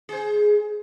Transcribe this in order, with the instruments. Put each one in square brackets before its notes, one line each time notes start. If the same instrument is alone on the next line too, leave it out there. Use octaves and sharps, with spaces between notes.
[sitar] G#4 C5